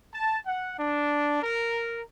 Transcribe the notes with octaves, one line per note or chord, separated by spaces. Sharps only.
A5
F#5
D4
A#4